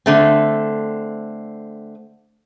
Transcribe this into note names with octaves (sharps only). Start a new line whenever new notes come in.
D3 A3 C4